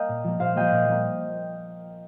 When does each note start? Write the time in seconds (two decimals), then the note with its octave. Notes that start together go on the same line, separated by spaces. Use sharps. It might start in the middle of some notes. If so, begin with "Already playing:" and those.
Already playing: A#3 A#4 D#5 F5 G5 A#5
0.09 A#2
0.24 F3 A#3
0.40 A#2 C5 F5
0.56 F3 A#3 D#5 G5
0.72 A#2
0.88 F3 A#3